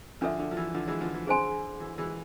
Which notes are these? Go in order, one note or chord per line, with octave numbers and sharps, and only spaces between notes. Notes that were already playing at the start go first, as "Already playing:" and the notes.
D3 F3 D4 A4 E5
D3
F3
E3
D3 F3
E3 G#3
D3 F3
E3
D3 G#4 C5 G#5 C6
E3
E3 G#3